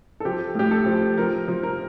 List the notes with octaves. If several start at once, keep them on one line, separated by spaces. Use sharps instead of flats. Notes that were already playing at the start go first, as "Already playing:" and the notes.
A4
F3 G4
A2 G4
A4
F3
F3 A#4
F3
A#4